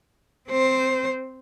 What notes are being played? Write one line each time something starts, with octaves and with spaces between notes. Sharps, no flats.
C4 C5